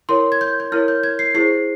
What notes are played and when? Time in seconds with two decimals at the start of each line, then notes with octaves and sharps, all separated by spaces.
0.09 E4 A#4 C#5 C6
0.32 G#6
0.41 G6
0.60 G6
0.72 E4 A#4 C#5 F6
0.88 G6
1.03 G#6
1.19 C7
1.34 E4 G#4 C5 C7